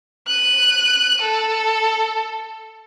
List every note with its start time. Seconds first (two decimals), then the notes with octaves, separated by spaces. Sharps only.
0.28 F#6 D#7
1.22 A4